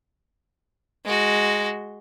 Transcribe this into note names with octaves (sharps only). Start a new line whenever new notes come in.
G#3 F#4